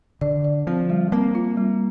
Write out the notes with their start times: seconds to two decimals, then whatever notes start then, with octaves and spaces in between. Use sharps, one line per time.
0.21 D3 D5
0.44 D5
0.67 F3 C4
0.90 G3
1.12 A#3 C4
1.35 F4
1.57 G3